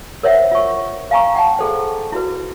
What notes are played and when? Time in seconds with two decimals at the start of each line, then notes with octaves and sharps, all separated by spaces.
0.23 A#4 C5 C#5 E5 F#5
0.51 F4 C#6
1.11 F5 G5 G#5 A#5 C#6
1.35 F#5 G5 A5
1.59 G#4 A4 C5
2.12 E4 F#4 B4